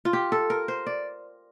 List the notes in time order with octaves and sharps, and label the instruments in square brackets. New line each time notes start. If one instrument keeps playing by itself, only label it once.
[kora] F4
G4
A4
A#4
C5
D5